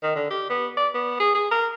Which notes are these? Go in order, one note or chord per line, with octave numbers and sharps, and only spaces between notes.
D#3
D3
G4
B3
D5
B3
G#4
G#4
A#4